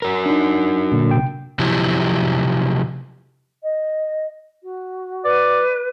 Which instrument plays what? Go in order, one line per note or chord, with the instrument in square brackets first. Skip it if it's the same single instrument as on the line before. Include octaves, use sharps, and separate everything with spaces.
[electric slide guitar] F#3 F#4 A#4
[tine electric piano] D4 D#4
[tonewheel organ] A#2 D3
[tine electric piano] C3 G5
[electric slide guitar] C3 F3 F#3 E4 G4
[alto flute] D#5
F#4
[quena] B4 [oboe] D5